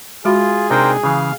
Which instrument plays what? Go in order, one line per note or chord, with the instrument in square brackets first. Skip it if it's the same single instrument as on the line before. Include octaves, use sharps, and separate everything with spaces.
[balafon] G#3 F#4 B5 [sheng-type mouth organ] F4 [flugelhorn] G#4
[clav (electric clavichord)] C3 D4 D#4 [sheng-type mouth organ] A#4 C5 G5
[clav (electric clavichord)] C#3 E3 [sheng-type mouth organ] F5